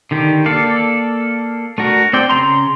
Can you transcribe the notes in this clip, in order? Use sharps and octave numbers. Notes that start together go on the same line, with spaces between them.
D3 D#3 G4
A#3 A4 D5 F5
A3 D4 F#4 A#4
C4 D5 G5
C#3 A#3 A#5 C6